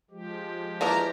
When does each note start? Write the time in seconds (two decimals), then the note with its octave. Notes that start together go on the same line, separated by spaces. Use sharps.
0.11 F3 G#3 G4
0.81 E2 D#3 A#3 D4 A#4 A5 A#5